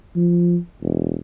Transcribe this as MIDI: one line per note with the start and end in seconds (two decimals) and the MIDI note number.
0.16 0.58 53
0.83 1.17 28